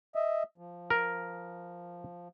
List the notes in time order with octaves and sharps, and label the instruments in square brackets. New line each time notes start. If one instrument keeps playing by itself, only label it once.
[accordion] D#5 E5
F3
[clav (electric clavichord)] A#4